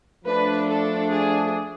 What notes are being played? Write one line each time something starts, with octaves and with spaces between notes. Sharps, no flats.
F3 A3 D4 B4
A4
G#4